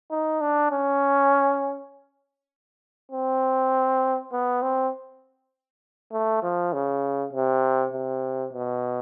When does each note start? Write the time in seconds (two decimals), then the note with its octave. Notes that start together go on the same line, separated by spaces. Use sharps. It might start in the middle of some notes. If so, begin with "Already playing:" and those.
0.11 D#4
0.41 D4
0.72 C#4
3.11 C4
4.32 B3
4.62 C4
6.12 A3
6.43 F3
6.73 C#3
7.33 C3
7.92 C3
8.53 B2